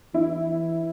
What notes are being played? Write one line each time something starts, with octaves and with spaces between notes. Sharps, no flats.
E3 E4